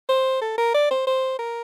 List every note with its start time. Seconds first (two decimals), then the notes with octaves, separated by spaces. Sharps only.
0.09 C5
0.41 A4
0.58 A#4
0.74 D5
0.91 C5
1.07 C5
1.39 A#4